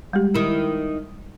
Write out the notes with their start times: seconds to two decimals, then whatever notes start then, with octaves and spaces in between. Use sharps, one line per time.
0.13 G3 G#3 G4
0.34 D#3 E4